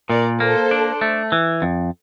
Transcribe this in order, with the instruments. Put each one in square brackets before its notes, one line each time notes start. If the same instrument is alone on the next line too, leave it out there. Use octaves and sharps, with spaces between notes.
[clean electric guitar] A#2 [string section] A#4 D5
[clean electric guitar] A#3 [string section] A4 C5
[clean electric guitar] D4
A3
E3
F2